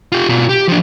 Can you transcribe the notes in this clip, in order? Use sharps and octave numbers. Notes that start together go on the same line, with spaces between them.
F4 G4
B2 F4
G4
F3 D4